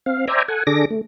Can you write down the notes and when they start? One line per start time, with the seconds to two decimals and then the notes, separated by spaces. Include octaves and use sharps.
0.06 C4 F5
0.28 C5 D5 E5 G5 G#5 A#5
0.48 A4 F#5 G#5
0.67 D3 D4 G#4 A4 D6 A#6
0.90 A3